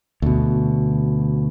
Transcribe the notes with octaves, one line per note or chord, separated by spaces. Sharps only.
D2 B2